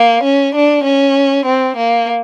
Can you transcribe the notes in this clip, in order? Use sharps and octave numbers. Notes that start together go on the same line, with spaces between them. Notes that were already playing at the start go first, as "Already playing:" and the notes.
Already playing: A#3
C#4
D4
C#4
C4
A#3